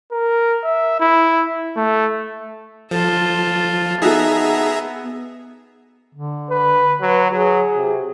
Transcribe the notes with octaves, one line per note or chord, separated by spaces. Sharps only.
A#4
E5
E4
A3
F3 F4 A4
B3 D#4 F#4 G#4 A4 E5 A#5
D3
B4
F#3 B4
F#3 G#4
C3